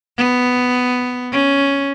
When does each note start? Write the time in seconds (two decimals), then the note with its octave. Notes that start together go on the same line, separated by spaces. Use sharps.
0.18 B3
1.32 C#4